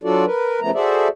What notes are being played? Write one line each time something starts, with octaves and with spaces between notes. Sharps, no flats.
F#3 D4 F4 F#4 A4 D5
A#4 B4
C#3 F3 A3 B3 A#5
F#4 G#4 A4 C5 D5 E5